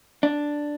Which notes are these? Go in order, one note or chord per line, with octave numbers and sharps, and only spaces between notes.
D4